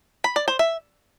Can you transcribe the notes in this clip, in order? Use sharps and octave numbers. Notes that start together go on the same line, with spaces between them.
B5
D5
C5
E5